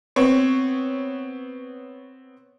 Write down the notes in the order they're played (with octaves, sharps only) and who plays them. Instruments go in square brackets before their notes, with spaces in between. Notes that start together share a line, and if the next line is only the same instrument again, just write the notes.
[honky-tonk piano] B3 C4 C#5